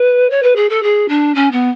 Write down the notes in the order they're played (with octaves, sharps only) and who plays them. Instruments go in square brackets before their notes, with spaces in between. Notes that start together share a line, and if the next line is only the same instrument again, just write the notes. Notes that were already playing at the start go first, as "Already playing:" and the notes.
Already playing: [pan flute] B4
C#5
B4
G#4
A4
G#4
D4
C#4
B3